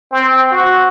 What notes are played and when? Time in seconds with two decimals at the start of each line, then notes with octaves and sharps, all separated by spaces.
0.12 C4
0.51 F#4